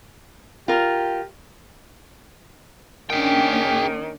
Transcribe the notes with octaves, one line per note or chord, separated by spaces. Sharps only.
F4 G4 A#4
D#3 A#3 C#4 D4 G#4 G5